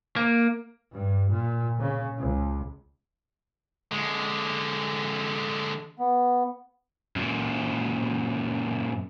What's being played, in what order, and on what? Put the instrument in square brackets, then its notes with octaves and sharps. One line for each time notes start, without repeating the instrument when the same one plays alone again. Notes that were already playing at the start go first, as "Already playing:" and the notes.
[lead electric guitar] A#3
[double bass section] G2
A#2
C#3
C#2
[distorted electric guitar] D3 G#3
[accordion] B3
[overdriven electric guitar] F#2 A#2